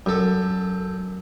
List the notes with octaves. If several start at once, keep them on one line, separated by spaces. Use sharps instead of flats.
F#2 A4